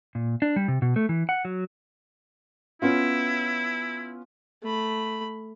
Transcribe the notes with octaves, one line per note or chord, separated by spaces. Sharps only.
A#2
D4
G3
C3
B2
A3
E3
F#5
F#3
B3 C#4 E4 F4
A3 B5